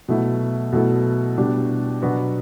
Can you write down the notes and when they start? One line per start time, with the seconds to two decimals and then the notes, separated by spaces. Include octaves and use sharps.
0.08 B2 F#3 A3 E4
0.72 B2 F#3 A3 E4 A4
1.38 B2 G3 D4 G4
2.02 B2 F#3 B3 D4 F#4